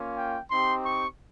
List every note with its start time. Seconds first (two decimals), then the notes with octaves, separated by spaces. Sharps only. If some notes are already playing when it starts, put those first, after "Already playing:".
Already playing: A#3 C#4 F4
0.17 G5
0.51 C4 D#4 G4 C6
0.85 C#6